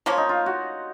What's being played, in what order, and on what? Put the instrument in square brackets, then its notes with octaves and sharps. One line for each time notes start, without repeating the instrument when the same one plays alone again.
[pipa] F3 A#3 C#4 [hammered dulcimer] F4
[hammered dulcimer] D#4
F4
F#4